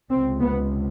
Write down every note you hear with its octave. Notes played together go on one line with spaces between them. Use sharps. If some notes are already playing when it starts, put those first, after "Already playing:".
C#2 C3 C4
B3